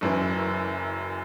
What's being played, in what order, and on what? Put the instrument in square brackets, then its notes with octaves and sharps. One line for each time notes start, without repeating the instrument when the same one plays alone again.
[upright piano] F#1 F#2 E3